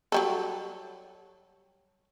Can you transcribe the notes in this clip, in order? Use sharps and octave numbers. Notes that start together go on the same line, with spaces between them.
F#3 G3 A4